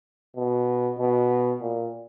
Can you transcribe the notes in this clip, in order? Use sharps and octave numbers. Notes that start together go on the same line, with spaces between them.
B2
B2
A#2